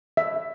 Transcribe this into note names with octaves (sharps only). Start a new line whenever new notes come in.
E5